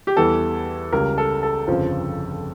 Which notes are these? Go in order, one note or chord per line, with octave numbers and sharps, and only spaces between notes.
G4
E2 E3 G3 A4
C#2 C#3 G3 A#4
A4
A4
G1 F2 C#3 F3